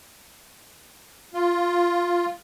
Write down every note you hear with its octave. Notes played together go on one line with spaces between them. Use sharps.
F4